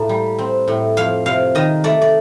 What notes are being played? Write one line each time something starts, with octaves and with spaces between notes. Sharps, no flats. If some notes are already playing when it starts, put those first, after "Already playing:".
Already playing: A2 A#3 A5
G3
C4
A2
F2 F5
C3 F5
D#3 D#5
A3 D5
D5